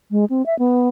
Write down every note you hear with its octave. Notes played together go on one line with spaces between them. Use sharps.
G#3
C4
E5
B3